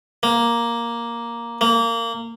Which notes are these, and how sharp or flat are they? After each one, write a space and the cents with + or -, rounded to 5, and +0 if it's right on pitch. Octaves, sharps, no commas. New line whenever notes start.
A#3 +5
A#3 -20